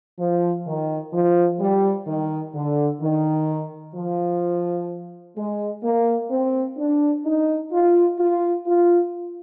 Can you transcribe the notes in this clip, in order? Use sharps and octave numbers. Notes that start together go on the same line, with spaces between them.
F3
D#3
F3
G3
D#3
D3
D#3
F3
G#3
A#3
C4
D4
D#4
F4
F4
F4